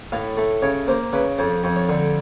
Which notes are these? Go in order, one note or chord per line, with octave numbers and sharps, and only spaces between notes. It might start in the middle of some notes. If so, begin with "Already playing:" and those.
A2 F5
A3
C#3 C#5
A#3 C5
C#3 B4
F2 C5
F2
C#5
D3